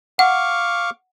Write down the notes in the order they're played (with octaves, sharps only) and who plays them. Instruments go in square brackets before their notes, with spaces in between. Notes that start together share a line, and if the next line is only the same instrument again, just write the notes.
[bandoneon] F5 C#6 D6 [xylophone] F#5